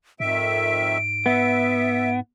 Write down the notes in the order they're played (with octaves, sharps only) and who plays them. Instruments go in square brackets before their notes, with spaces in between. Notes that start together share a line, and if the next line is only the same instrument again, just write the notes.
[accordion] F2 D#3 E5 [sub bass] G#2 [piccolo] D7
[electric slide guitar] B3 [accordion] E5